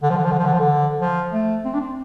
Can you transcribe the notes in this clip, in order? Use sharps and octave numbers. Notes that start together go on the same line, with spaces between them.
D3
F3
D3
F3
D3
F3
D3
F3
D3
F3
A3
C4
D4
C4